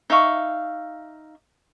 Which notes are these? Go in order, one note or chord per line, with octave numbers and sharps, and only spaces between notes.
D#4 E5 F5 C#6